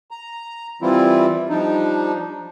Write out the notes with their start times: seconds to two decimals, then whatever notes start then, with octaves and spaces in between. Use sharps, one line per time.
0.11 A#5
0.82 E3 G3 C4 E4 F4
1.50 F3 G3 D4 D#4